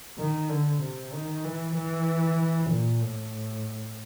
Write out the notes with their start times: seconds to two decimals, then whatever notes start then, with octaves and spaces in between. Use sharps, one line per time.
0.18 D#3
0.49 D3
0.81 C3
1.13 D#3
1.44 E3
1.76 E3
2.70 A#2
3.01 A2